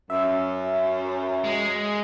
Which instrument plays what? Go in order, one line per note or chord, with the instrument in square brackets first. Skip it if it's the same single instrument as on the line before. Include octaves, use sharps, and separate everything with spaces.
[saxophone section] F#2 [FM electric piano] E5
[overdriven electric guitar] G#3